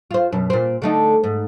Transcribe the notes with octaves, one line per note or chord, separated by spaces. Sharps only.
F4 C5
F#2 B2
A#2 C4
D3 A3 D#4
G#2